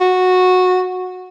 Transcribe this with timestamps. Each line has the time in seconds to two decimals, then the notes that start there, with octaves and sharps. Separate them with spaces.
0.01 F#4